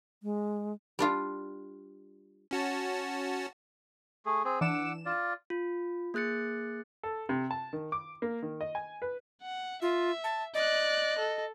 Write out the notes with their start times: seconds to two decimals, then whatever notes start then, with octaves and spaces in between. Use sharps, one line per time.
0.23 G#3
0.99 G3 D4 F4
2.51 C#4 F#4 A5
4.26 A3 G#4
4.45 C4 G#4
4.61 E3 D4 F#5 D6 E6 E7
5.06 F4 D5
5.50 F4
6.14 A#3 G#4 F#6 A6 C#7
7.03 A4
7.29 C3
7.51 A5
7.73 D#3
7.92 D6
8.22 A#3
8.42 D#3
8.61 D#5
8.75 G#5
9.02 B4
9.41 F#5
9.82 F4 E5
10.24 A5
10.54 D5 D#5 F#6
11.18 A4